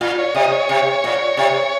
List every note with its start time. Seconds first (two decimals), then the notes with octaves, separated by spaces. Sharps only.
0.01 A#2 F4
0.19 C#5
0.34 C3 D#5
0.52 C#5
0.69 C3
1.04 A#2
1.37 C3